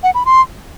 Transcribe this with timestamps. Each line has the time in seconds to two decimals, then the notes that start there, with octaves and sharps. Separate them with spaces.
0.03 F#5
0.14 B5
0.26 C6